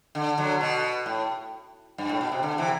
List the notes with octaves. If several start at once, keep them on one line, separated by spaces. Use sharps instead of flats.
D3
D3 F#3
B2
A2
G2
A2
B2
C3
D3
C3 E3